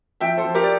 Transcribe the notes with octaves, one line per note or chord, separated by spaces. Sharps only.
F3 E5 G5
A4 C5
F3
G4 A#4
D5